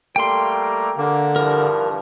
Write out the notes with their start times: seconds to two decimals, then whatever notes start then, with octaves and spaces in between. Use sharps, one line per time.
0.16 G3 A3 A#3 G5 C6
0.98 D3 A#3
1.36 G2 E3 F3 A#4